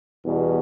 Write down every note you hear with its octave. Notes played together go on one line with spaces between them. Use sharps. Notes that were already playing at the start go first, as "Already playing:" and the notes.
E2 B2 G3